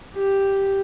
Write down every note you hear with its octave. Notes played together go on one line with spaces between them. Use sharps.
G4